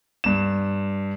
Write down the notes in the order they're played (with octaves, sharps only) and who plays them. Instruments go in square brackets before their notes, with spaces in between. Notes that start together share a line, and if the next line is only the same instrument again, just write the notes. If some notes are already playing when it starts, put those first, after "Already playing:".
[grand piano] G2 E7